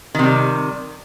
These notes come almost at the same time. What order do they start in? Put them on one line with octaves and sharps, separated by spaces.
D#3 C3 G3